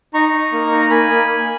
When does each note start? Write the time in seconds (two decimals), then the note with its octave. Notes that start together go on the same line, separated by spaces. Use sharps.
0.14 D#4 A#5 C#6
0.33 D#4
0.52 A#3
0.71 D#4
0.82 A#5
0.90 A#3 G#5 B5
1.10 A#3
1.28 A#3